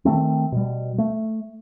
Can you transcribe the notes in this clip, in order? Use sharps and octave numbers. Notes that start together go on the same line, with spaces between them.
D#3 F3 A3 C4
B2 G3
A3